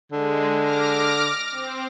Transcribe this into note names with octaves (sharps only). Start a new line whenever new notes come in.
D3 G#3
D6 F6 A#6
C4